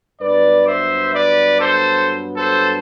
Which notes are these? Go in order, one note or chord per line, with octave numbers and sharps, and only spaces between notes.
G2 F#3 B3 B4 D5
C5 E5
B4 D5
A4 C5
A4 C5